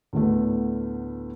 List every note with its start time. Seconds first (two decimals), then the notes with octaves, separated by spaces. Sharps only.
0.13 D2 A2 D3 A3 B3